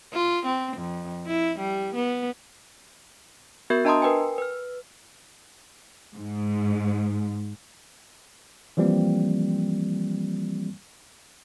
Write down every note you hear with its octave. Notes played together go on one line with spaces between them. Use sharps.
F4
C4
F2
E4
G3
B3
B3 F#4 A#4 E5 G6
D4 D#5 A5 A#5 C6 D#6
A#4 B4 G5 G#5
B4 F6
G#2
E3 F3 G3 A#3 C4